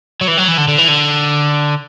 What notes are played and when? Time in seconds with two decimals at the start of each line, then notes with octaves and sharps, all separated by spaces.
0.21 F#3
0.28 E3
0.38 F#3
0.48 E3
0.58 D3
0.68 D3
0.78 E3
0.88 D3